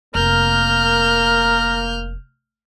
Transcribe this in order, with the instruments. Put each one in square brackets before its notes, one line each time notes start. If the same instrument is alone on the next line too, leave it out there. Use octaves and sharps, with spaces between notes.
[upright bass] F1 [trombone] A#3 [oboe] A#4 [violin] F6 G6